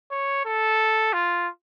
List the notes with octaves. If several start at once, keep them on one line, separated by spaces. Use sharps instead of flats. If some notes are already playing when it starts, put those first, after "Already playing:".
C#5
A4
F4